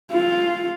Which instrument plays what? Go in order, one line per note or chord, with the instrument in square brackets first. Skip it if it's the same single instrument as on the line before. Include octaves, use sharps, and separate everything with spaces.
[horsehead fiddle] F4